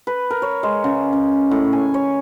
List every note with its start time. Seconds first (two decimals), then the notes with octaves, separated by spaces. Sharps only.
0.07 B4
0.31 A#4
0.42 C#5
0.63 G#3
0.84 C#3
1.13 C#4
1.51 A2
1.73 G#5
1.94 C#5